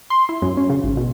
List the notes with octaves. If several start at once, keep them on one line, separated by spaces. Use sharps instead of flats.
C6
E4
F#2
C#4
C#3
G#1
B2